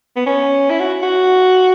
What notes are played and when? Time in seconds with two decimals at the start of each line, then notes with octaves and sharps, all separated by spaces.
0.16 B3
0.26 C#4
0.70 E4
0.80 F#4
1.02 F#4